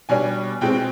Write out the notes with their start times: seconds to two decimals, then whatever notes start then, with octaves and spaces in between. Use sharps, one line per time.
0.09 B2 G3 D4 G#5
0.61 B2 G#3 C4 G5